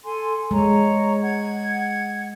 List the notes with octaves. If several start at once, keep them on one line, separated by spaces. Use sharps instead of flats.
A4 G#5 C6
G#3 C#5 A#5
F#5 G#6